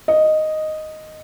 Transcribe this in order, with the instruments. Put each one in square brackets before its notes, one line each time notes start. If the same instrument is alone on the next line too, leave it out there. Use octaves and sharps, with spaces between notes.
[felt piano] D#5